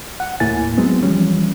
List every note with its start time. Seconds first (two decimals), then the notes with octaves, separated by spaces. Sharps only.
0.20 F#5
0.40 D#2 A2 A#3 E4 G#5 A6
0.77 F#3 G#3 B3 C4
1.03 E3 F3 G3 C#4